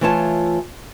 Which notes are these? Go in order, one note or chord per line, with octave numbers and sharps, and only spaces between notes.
E3 A3 F4 C#5 G#5 A5